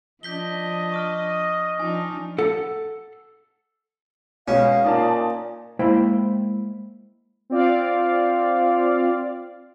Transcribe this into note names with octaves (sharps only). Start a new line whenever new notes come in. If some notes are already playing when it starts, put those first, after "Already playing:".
F3 D4 D#5 G6 B6 G7
C#6 D#6 F6
F3 D4 D#4 G#5
A4 F#5
B2 G#3 C#4 F5
A#2 D#4 D5 A5
G#3 A#3 E4 C5 F5 G5
C4 F4 D5 F5